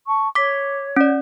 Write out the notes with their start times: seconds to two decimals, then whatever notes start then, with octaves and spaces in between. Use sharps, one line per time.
0.08 A5 C#6
0.35 C#5 D6 B6
0.96 C#4 D5